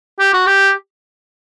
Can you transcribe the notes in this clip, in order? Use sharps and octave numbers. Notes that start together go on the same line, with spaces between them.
G4
F#4
G4